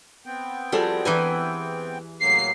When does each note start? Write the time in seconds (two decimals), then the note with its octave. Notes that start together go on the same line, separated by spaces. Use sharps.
0.26 B3 C4 G5
0.72 F3 G3 F#4 G#4 A4
1.05 E2 E3 E4 B4 G#5 A#5
2.21 A2 F#3 A#3 C7